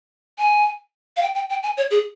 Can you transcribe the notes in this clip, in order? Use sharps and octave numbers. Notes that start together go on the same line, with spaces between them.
G#5
F5
G5
G5
G5
G#5
C#5
G#4